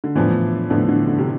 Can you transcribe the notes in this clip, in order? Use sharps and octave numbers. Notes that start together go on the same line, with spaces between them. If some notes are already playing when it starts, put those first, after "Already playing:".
D3
A2 E3 F3 B3 D4
A2 D3 F3 B3 D4
D3
D3
C3